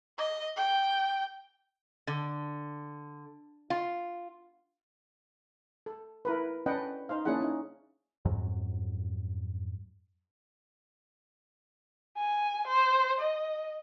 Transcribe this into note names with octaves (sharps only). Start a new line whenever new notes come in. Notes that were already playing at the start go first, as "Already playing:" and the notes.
D#5
G5
D3
F4
A4
E4 A#4 B4
C#4 D4 B4 D#5 F#5 G5
D#4 C5 F5
A#3 C#4 D4 E4 G#4 F#5
C#4 D#4
F2 G#2 F#3
G#5
C5
D#5